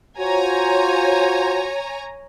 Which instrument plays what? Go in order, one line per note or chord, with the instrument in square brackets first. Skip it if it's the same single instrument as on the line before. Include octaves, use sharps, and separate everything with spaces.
[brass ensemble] F4 F#4 C5 [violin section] C#5 G#5 A#5